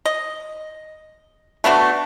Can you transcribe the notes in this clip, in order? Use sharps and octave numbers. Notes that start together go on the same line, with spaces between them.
D#5
A3 B3 D4 F#4